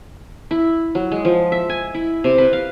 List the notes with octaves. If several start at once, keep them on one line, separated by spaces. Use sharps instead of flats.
E4
F#3
G#3
F3
E5
G#5
E4
C3
B4
F5